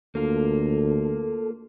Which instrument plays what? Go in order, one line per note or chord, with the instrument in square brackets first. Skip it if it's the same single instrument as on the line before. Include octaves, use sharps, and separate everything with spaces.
[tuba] D2 [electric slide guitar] A#3 F4 [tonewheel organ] A4